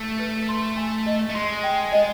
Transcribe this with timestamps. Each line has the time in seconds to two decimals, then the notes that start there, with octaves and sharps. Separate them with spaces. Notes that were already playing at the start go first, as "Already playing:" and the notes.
Already playing: A3
0.19 B4
0.49 C6
0.77 G#5
1.06 D#5
1.29 A3
1.35 G#3 C6
1.63 G5
1.92 D#5